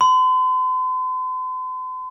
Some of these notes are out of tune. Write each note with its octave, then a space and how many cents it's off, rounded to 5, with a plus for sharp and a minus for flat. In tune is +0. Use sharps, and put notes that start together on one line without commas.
C6 -45